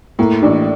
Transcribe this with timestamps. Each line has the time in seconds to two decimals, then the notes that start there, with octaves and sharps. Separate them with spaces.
0.19 A2 A#3
0.42 A1 D4